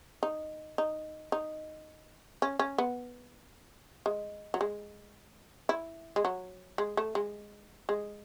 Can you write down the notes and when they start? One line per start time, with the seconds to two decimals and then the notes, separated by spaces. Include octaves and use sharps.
0.23 D#4
0.78 D#4
1.32 D#4
2.42 C#4
2.59 C#4
2.78 B3
4.06 G#3
4.54 F#3
4.61 G#3
5.69 E4
6.16 G#3
6.25 F#3
6.78 G#3
6.97 A3
7.15 G#3
7.89 G#3